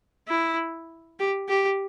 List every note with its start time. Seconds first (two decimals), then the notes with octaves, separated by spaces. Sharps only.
0.28 E4
1.19 G4
1.49 G4